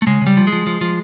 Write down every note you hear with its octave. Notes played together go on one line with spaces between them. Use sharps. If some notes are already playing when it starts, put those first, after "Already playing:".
A3
C#3 G#3
C#3 G3
F3
G#3
F3
F3
F3